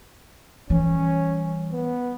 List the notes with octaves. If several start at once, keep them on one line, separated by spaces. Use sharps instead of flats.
E3 G3 C#4
B3